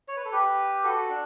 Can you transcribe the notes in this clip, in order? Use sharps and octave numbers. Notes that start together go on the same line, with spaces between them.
C#5
B4
A4
G4 B4
F#4 A4
D4